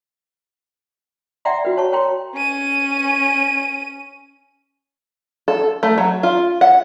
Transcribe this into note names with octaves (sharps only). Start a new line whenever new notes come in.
D5 E5 F#5 G5 A#5 C6
F#4 B4
C#5 A5 C#6
A#4 C#5 G5 A#5 C6
C#4 D#7
A4
A3
F#3
F4
F#5